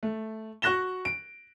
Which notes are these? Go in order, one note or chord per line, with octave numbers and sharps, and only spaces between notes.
A3
F#4 C#6 F#6 A#6 E7 G7
D7